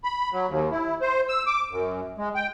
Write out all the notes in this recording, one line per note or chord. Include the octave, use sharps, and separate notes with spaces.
B5
F#3
D#2
E4
C5
E6
D6
F#2
G#3
G5